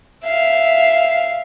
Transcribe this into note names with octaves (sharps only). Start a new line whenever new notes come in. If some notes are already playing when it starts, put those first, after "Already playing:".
E5 F5